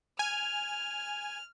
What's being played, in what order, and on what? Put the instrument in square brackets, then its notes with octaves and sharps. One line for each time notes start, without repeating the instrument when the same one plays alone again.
[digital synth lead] G#5 [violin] F6